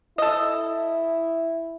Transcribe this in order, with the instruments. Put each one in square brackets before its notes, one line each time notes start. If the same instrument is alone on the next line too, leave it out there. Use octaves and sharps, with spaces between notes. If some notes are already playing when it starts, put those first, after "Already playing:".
[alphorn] E4 [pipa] A4 D#5